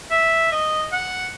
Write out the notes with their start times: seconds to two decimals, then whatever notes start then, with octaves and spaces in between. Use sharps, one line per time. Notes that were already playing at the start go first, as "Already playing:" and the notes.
0.10 E5
0.52 D#5
0.92 F#5